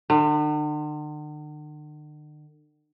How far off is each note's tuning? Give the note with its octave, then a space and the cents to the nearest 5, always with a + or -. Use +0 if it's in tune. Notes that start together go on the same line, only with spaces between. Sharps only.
D3 +45